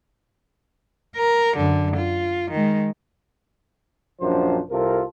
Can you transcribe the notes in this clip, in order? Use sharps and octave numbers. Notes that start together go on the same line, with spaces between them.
A#4
F#2 D3
F4
D#3 G#3
A#1 F#2 F3 D4 C5
C2 C3 F4 A4 A#4